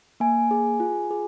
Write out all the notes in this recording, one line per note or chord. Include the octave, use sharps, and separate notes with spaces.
A#3 G#5
G#4
F4
G#4